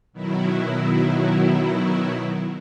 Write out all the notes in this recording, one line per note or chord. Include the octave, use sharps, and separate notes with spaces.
B2 D#3 F#3 E4